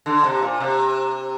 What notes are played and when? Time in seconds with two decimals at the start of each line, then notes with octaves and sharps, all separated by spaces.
0.06 D3
0.24 C3
0.42 A#2
0.60 C3